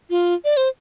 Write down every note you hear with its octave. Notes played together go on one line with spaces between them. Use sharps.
F4
D5
C5